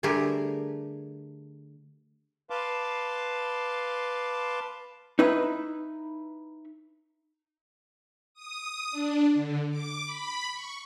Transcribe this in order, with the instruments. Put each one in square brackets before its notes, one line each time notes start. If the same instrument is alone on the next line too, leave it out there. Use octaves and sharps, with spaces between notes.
[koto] D3 G3 A3 G4 G#4 A#4
[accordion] B4 F5 A5 C6 D6
[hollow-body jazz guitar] D#4 E4 B4 E5
[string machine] D#6
D4
D3
D6
B5
C#6